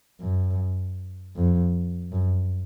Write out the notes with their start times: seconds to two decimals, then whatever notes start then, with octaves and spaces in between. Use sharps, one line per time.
0.21 F#2
1.36 F2
2.12 F#2